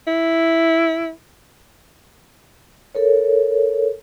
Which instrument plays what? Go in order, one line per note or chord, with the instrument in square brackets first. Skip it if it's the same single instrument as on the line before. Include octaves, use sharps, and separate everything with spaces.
[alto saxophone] E4
[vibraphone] A4 A#4 C#5